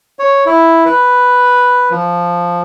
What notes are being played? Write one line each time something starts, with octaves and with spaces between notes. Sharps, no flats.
C#5
E4
B4
F3